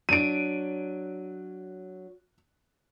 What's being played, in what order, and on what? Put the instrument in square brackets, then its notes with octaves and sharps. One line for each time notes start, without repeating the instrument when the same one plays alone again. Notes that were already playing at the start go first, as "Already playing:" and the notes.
[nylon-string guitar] F#3 D4 [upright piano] D7 D#7